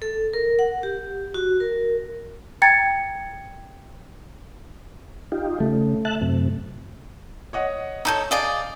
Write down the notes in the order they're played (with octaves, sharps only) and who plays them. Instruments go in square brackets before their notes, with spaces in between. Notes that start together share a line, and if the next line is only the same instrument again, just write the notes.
[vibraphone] A4
A#4
F#5
G4
F#4
A#4
[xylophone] G5 A#5 G#6 A6 C#7
[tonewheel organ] D#4 F4 G4
[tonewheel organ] C#3 [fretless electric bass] A3
[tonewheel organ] E5 A5 F#6
F#2 C3
[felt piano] C#5 D#5 F#5
[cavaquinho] D#4 G#4 A4 [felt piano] C#5 G6
[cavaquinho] G#4 D5 D#5 [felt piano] F5